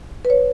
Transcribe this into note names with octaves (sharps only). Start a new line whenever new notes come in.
B4
C#5